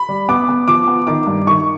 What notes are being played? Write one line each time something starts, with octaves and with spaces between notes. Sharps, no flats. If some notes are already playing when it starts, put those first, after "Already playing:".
Already playing: B5
G3
B3 D6
B3
F3 D6
B3
D#3 D6
G2
D#3 C#6